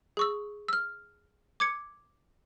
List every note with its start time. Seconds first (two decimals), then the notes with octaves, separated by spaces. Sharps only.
0.17 G#4 C#6 E6
0.68 E6 F6
1.60 D6 G#6 C#7